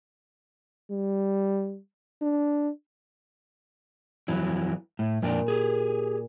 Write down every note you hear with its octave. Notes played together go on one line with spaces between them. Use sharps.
G3
D4
F2 E3 F#3
A2
F2 A#2 D4 G5
G4 G#4